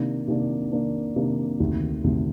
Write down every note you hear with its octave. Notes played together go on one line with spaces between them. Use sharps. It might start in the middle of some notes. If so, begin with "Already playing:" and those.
Already playing: C3 D#3 A#3 D4
C3 D#3 A#3 D4
C3 D#3 A#3 D4
C3 D#3 A#3 D4
D2 C3 D#3
D2 C3 D#3